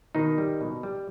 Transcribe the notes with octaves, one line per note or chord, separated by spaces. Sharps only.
B2 D#3 D#4
G3
B2
G3